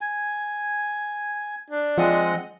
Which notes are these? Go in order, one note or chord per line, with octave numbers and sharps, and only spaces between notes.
G#5
D4
F3 G#3 C4 D#5 F#5